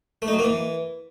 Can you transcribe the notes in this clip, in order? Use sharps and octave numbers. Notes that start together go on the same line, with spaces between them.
A3
D#4
F#3
A#3
E3